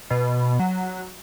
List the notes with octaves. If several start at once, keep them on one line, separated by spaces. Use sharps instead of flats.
B2
F#3